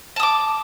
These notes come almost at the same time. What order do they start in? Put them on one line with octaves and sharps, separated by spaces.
A5 D#6 D6